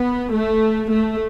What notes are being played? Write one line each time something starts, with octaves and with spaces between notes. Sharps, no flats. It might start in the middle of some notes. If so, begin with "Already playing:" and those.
Already playing: B3
A3
A3